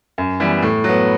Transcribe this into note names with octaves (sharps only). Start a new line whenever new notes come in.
F#2
E3 G3 B3
A2
F#3 B3